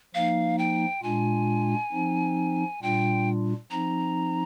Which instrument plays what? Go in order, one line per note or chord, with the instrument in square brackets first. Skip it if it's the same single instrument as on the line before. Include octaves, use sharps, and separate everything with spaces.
[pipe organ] F3 A#3 D#4 [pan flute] F5
[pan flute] G5
[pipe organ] A#2 G#3 D4 F4 [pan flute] G#5
[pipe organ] F3 C4 D#4
[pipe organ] A#2 G3 D4 F4 [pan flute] G5
[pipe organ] F3 C4 D#4 [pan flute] A#5